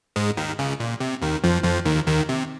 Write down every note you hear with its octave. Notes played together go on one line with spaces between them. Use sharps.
G#2 G#3
D#2 D#3
C#2 C#3
A#2
C3
D#2 D#3
F2 F3
F2 F3
D#2 D#3
D#2 D#3
C3